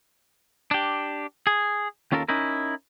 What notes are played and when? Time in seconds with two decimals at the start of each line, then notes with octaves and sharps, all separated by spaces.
0.71 D4 G4
1.47 G#4
2.12 D#2 C#4 F4 A4 A#4
2.28 C#4 D#4 E4 A#4